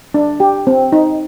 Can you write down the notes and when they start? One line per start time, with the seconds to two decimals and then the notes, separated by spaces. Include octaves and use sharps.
0.14 D4
0.40 G4
0.67 C4
0.92 D#4